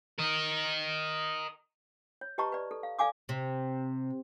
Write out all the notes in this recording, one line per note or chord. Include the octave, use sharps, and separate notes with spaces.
A#4 D#5
C#5
G4 B4 D#5 A5 A#5 C#6
B4 D5
A4
F5
A4 D5 F5 G#5 D6 D#6
C3